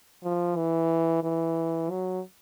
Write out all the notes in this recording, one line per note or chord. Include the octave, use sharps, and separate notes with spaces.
F3
E3
E3
F#3